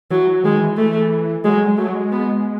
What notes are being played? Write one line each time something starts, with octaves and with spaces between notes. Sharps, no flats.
E3 F#3
F#3
D#3 G#3
E3
A3
F#3 G#3
G#3
F#3 A3
F#3
G#3
B3